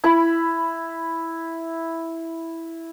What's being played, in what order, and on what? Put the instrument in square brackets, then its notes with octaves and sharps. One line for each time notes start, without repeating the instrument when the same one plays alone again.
[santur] E4 B5